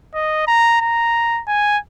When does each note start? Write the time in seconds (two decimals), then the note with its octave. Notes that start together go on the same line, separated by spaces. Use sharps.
0.15 D#5
0.47 A#5
0.81 A#5
1.47 G#5